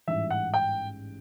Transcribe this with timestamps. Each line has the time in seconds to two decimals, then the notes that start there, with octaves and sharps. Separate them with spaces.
0.07 A1 G#2 E3 G3 E5
0.30 F#5
0.54 G5